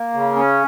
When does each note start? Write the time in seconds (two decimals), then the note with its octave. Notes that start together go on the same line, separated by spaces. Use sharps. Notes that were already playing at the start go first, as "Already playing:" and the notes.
Already playing: A#3
0.14 C#3
0.36 C#4